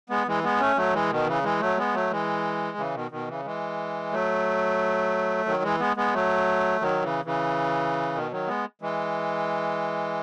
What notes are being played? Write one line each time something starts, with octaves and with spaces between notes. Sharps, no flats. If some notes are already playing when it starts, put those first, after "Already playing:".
G#3 B3
E3 G#3
G#3 B3
A3 C#4
F#3 A3
E3 G#3
B2 D#3
C#3 E3
E3 G#3
F#3 A3
G#3 B3
F#3 A3
E3 G#3
C#3 E3
B2 D#3
B2 D#3
C#3 E3
E3 G#3
F#3 A3
D#3 F#3
E3 G#3
G#3 B3
G#3 B3
F#3 A3
D#3 F#3
C#3 E3
C#3 E3
B2 D#3
D#3 F#3
G#3 B3
E3 G#3